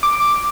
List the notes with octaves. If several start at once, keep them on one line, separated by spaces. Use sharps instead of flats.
D6